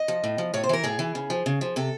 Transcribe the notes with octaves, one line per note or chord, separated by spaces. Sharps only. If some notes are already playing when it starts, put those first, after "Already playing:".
Already playing: D#5
F3
A2
F3
A2 C#5
C5
E3 A#4
A2 G#4
E3
C#3
F3
C#3
F3
C3 A4